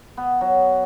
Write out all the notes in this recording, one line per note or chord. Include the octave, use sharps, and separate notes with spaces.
B3
F#3